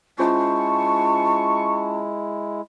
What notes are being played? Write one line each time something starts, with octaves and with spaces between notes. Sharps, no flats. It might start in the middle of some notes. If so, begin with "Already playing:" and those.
G#3 C#4 E4 F4 C5 A5 C#6